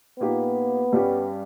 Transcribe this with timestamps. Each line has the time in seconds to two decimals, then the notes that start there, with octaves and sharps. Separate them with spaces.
0.20 A#2 A#3 B3 D#4 G4
0.93 G2 G3 C#4 G4